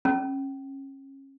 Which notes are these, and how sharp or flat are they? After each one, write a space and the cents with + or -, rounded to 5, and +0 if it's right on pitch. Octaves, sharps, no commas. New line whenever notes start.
C#4 -30